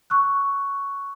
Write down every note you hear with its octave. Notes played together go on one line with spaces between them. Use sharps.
C#6 E6 F#6